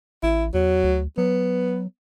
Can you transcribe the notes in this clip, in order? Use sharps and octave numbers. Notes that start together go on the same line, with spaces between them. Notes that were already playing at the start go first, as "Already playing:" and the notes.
A1 E4
E2 F#3
D2
F#3 B3